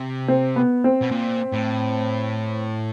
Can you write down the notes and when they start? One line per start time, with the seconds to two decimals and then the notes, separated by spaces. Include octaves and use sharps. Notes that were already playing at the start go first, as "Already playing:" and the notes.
Already playing: C3
0.28 C4
0.56 B3
0.84 C4
1.02 B2
1.11 A#2
1.53 A2